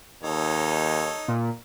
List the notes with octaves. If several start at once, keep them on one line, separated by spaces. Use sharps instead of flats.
D#2 D#4 A4 C#5
A#2